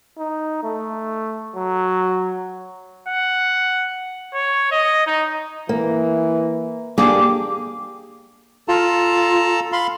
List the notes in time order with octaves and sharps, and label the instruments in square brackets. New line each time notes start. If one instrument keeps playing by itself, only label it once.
[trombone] D#4
A3
F#3
[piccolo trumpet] F#5
C#5
D#5
D#4
[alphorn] E3 [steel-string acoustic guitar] A#3
[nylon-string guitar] A#3 D4 [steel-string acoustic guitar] G4 G#4 [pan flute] D6
[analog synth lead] F4 [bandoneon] A4 A5 A#5
[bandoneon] F5 B5 C6